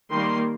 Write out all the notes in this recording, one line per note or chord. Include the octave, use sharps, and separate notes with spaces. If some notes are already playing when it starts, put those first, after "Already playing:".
D#3 G3 A#3 C6